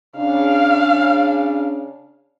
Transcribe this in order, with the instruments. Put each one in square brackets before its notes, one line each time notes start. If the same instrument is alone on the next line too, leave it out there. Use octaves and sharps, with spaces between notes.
[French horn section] C#3 D4 [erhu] F5